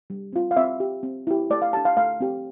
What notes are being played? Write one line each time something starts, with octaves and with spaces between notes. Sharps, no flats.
G3
C4 F4
F5
C4 E5
G4
C4
E4 G4
A3 D5
F5
D4 G4 A5
F5
A3 F5
C4 G4